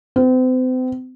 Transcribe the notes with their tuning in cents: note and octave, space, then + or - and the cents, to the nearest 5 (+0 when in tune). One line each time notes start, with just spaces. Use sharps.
C4 -40